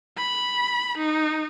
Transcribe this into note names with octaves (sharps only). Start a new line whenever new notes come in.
B5
D#4